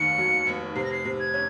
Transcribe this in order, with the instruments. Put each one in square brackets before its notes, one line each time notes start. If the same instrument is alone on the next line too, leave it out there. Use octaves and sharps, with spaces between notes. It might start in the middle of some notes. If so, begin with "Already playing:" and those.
Already playing: [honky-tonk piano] F1 D#2 D#3 [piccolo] C#7
[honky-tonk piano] F#3
F1
[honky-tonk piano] C3 [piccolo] C7
[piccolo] A#6
C7
[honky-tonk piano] C3
[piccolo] G#6
[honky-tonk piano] C#4